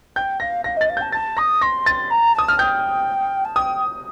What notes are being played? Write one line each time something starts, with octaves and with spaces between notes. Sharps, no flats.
G5 G6
F5 A#6
F5 A#6
D#5 A6
F5
G6
A5
A5 A6
D#6 A#6
C6 A#6
A6
A#5
A5 D#6
F6
G5 G6
A5
G5 D#6